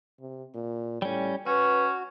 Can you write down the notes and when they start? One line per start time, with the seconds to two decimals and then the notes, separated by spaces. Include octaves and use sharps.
0.20 C3
0.54 A#2
1.02 A2 G3 C#4
1.46 C#4 F#4 B4